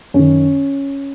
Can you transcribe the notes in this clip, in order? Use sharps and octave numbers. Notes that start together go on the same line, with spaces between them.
F#2 D#3 C#4